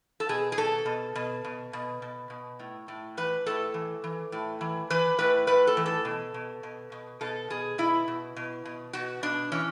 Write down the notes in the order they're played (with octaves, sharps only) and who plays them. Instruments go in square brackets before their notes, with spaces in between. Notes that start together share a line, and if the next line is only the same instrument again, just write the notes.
[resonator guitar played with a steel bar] A4
B2 G#4
G#4
B2 A4
B2
B2
B2
B2
B2
B2
A2
A2
E3 B4
A2 A4
E3
E3
A2
E3
E3 B4
A2 B4
A2 B4
A4
E3
A4
B2
B2
B2
B2
B2 A4
B2 G#4
B2 E4
B2
B2
B2
B2 F#4
B2 D4
E3 C#4